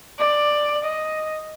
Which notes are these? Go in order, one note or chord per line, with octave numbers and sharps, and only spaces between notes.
D5
D#5